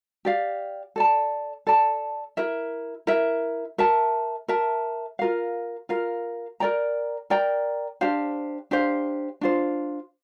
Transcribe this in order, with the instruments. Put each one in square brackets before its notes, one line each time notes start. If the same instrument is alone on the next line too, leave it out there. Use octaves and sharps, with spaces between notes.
[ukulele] G4 D5 F5
A4 D5 A5
A4 D5 A5
E4 A#4 E5
E4 A#4 E5
A#4 E5 A5
A#4 E5 A5
F4 A#4 F5
F4 A#4 F5
A#4 D5 G5 A#5
A#4 D5 G5 A#5
D4 G4 C5 F5
D4 G4 C5 F5
D4 F4 C5